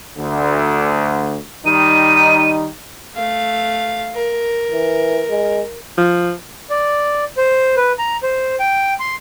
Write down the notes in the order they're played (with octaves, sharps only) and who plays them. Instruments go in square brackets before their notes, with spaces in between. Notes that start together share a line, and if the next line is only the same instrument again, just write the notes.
[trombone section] D2 D3
[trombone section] D#3 G3 D#4 [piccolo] D#7
[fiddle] A3 F5
A#4
[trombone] E3
G#3
[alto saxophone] F3
[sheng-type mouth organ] D5
C5
B4
A#5
C5
G5
C6